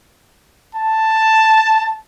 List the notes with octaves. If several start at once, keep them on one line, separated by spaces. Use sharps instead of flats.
A5